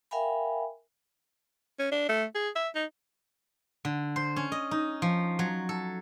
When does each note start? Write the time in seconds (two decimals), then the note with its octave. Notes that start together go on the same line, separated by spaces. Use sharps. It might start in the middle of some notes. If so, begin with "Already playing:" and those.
0.11 A#4 E5 F5 G5 G#5 B5
1.79 C#4
1.91 D4
2.09 A3
2.35 G#4
2.55 E5
2.75 D#4
3.85 D3
4.16 C5
4.36 C#4
4.52 D#5
4.71 D#4
5.02 F3
5.39 F#3
5.69 A4